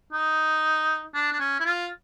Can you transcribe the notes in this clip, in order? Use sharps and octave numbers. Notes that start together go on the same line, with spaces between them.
D#4
D4
D4
C#4
E4
F4